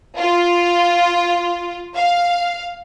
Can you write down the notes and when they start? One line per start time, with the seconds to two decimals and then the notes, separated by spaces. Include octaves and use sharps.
0.17 F4
1.94 F5